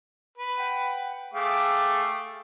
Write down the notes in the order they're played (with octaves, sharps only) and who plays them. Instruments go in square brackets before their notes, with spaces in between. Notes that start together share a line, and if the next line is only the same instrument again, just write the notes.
[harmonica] B4
[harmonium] F#5 G5
[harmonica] A3 D6 [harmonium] G#4 F5 G5